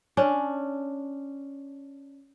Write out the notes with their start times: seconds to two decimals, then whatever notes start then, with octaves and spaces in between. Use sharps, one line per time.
0.17 C#4 D4